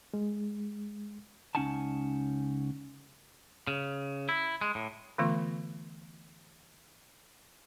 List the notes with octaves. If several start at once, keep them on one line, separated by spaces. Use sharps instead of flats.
G#3
C#2 C#4 D#4 F#5 G#5 A5
C#3
E4
G#3
A2
D3 E3 A3 B3 F4